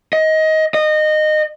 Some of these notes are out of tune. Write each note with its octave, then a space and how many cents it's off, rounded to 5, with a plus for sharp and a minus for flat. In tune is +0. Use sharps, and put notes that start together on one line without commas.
D#5 +20
D#5 -20